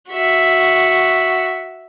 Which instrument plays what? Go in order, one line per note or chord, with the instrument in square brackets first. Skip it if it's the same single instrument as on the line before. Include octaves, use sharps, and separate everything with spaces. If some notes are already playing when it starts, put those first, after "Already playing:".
[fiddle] F#4 E5